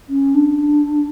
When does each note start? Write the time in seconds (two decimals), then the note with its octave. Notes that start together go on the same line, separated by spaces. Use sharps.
0.09 C#4
0.35 D4